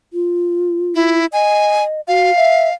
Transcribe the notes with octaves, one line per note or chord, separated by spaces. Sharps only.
F4
E4
D#5 G#5
F#4 F5
E5